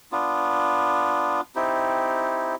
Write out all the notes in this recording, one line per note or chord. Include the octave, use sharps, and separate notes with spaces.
B3 D4 F4
C4 D#4 E4 G4